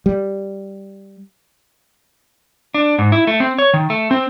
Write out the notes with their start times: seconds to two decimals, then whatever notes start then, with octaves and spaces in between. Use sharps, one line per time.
0.06 G3
2.74 D4
2.98 G#2
3.12 E4
3.27 A3
3.40 C4
3.58 C#5
3.74 D#3
3.90 A3
4.11 C4